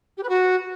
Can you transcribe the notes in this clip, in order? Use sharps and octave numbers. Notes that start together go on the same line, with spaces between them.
G4
B4
F#4